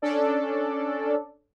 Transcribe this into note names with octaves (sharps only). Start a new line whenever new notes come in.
C#4 D4 A4 D5